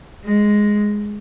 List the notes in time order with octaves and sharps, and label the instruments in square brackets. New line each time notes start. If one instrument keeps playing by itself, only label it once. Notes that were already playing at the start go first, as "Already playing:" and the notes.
[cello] G#3